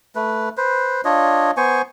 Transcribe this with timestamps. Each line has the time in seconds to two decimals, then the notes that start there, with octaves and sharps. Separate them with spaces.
0.15 A3 B4
0.57 B4 C5
1.05 D4 F4 C#5 D#5
1.57 B3 C5 G#5 C#6